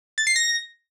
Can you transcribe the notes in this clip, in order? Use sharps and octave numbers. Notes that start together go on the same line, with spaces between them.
A6
C7
A#6